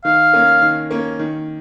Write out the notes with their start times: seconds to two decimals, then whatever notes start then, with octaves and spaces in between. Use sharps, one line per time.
0.04 D#3 F5
0.33 A#3 C#4
0.62 D#3
0.91 A#3 C#4
1.19 D#3